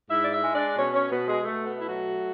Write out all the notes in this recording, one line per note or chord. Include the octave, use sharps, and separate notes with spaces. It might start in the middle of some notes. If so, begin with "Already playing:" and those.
G#2 E4 E5
D5
E4 E5
G#3
D4 D5
B2 C#4 C#5
C#4 C#5
B2 B3 B4
G#3 G#4
B2 A3
B3
A3 E4
F#3 F#4